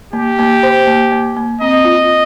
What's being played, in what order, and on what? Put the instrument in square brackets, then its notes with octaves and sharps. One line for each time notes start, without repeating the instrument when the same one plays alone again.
[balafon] A#3 [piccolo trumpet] G4
[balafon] A#3
C5
A#3
A#3
A#3
[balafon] C4 [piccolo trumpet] D#5
[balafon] F4